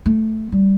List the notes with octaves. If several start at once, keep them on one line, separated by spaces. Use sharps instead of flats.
A3
G3